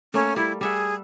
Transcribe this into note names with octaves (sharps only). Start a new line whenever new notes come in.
A3 A#3 C#4
G3 E4
G3 G#4 E5 F#5